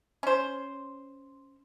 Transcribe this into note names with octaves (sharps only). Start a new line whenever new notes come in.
C#4 C5